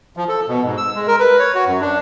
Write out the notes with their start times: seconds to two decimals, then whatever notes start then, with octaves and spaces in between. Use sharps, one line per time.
0.17 F3
0.29 A4
0.48 B2
0.63 G#2
0.77 E6
0.95 G#3
1.08 A#4
1.20 B4
1.39 C#5
1.55 F#4
1.67 F#2
1.81 D4